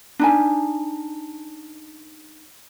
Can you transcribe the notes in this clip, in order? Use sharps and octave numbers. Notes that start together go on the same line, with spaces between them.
D4 D#4 G#5